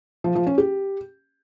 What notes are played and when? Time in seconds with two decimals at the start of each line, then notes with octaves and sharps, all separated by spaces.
0.24 F3
0.35 F3
0.47 C#4
0.58 G4